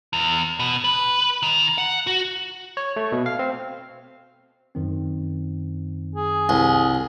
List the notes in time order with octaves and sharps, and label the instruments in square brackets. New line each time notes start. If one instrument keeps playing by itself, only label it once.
[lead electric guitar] E2
B2
B4
D#3
F#5
F#4
[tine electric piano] C#5
A3
B2
F5
C4
F#2 D#3 C4
[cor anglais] G#4
[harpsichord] C2